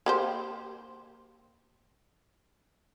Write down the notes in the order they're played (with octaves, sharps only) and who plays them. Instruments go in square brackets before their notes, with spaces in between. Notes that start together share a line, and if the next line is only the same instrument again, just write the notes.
[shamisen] A#3 G4 C5